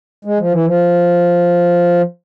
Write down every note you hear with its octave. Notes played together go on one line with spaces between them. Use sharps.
G#3
F3
E3
F3